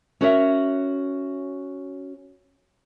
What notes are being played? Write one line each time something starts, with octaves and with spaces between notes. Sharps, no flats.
C#4 F#4 A#4 C#5 D#5 E5